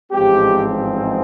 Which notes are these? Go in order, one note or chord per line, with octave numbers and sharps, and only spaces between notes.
A1 G#2 F3 G#3 C4 G4